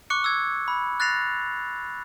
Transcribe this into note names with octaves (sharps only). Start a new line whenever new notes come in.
C#6 D6 F#6 C#7
E6 G#6
B5
F#6 A6 A#6 C7 F7